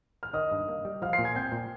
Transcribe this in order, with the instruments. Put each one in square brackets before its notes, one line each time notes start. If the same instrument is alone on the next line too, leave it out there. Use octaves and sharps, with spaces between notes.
[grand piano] F6
[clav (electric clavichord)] D#3 [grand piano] D#5 D#6
[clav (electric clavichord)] G2
A#3
G3
[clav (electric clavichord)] F3 [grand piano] F5 F6
[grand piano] C6 C7
[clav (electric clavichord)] A#2
[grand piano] G#5 G#6
[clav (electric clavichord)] C4 [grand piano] G5 G6
[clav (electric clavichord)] A#2